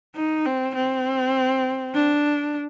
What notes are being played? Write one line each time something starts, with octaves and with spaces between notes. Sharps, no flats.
D#4
C4
C4
D4